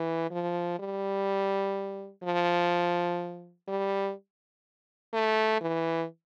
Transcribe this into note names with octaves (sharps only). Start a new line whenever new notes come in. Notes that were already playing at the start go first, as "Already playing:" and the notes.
Already playing: E3
F3
G3
F3
G3
A3
E3